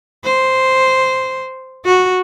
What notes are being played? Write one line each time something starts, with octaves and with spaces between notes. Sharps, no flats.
C5
F#4